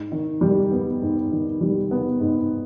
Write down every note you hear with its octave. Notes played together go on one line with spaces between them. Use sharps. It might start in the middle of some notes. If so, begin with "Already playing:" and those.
Already playing: G#2
D#3
G3
B3
G#2
D#3
G3
B3
G#2